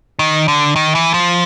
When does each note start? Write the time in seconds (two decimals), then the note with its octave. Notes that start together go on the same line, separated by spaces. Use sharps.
0.19 D#3
0.48 D3
0.76 D#3
0.95 E3
1.14 F3